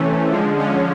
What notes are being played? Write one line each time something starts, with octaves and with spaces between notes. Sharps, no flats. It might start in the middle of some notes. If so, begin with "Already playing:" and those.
Already playing: C3 E3 A3 C#4
D3 F3 G#3
C#4